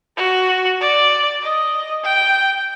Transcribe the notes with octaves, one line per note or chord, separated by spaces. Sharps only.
F#4
D5
D#5
G5